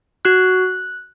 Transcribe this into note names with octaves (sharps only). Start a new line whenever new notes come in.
F#4 F#6